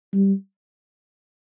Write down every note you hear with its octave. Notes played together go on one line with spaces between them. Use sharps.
G3